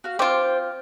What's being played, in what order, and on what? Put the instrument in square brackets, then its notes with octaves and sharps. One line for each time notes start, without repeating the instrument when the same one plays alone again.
[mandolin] F#4 F5
[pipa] C4 F4 [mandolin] C5 D6